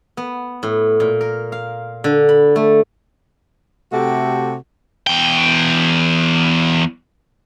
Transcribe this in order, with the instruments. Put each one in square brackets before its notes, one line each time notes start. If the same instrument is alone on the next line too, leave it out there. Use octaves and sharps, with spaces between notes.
[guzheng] B3
A2
A#2
A#4
F5
D3
B5
A3
[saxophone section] C3 A3 F#4 G4 A4
[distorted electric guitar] E2 G5